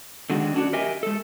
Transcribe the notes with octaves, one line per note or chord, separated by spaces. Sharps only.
D3 D#3 G#3 F#4
C#4 D4 F#4
G4 A#4 D#5 E5 G#5
G#3 A4